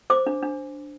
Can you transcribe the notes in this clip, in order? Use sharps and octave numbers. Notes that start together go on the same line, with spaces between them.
C5 D6
D4
D4